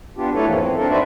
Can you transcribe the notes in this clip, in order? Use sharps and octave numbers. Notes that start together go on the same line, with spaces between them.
B3 D4 F4 G4
F#3 A3 E4 A4 B4 C#5
F2 G#2 E3 F3 A#3
C4
C4 D4 A4 A#4
D#4 F#4 B4 C5 D5 E5